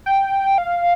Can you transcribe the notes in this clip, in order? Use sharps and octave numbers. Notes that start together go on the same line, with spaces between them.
G5
F5